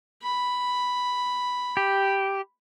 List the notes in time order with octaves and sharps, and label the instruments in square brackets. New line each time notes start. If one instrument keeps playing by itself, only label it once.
[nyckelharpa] B5
[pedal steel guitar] G4